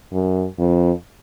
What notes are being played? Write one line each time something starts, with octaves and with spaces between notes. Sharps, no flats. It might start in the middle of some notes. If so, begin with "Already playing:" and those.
F#2
F2